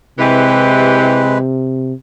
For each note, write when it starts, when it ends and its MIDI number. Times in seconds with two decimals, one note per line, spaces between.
0.19 1.93 48
0.19 1.41 52
0.19 1.38 56
0.19 1.41 67
0.19 1.38 71